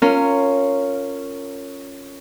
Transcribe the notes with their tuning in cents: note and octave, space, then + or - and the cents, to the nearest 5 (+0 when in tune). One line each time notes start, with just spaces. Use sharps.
C#4 +0 F4 +0 A#4 -20